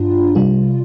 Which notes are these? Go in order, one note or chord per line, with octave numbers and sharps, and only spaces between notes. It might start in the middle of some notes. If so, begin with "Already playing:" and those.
Already playing: G2 D4 F4
C3 G3 F4